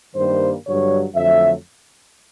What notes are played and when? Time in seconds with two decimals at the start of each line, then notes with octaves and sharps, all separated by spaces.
0.15 G2 D#3 G3 A#3 C5
0.66 G2 D3 F#3 C#5
1.15 F2 D3 F#3 A3 E5